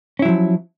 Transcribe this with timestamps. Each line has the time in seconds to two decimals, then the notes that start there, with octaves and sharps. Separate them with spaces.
0.19 C#4
0.22 E4
0.25 F#3
0.28 F3